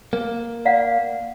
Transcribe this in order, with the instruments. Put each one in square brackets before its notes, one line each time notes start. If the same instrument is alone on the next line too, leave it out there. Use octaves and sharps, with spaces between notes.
[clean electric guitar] A#3
[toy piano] D5 F5 F#5